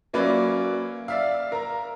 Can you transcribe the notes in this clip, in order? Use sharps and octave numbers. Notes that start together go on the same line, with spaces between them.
F#3 A#3 C#4 B4 D5 E5
D5 E5 F5
A#4 A#5